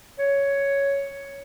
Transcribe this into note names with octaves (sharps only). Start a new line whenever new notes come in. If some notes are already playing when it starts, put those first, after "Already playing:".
C#5